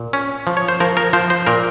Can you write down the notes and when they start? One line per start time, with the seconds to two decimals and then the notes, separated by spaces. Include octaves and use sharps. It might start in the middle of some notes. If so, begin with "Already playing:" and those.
Already playing: A#2
0.13 C#4
0.47 F3
0.57 C#5
0.68 C5
0.80 F3 A#4
0.97 A#4
1.13 F3 C5
1.30 C5
1.47 A#2 A#4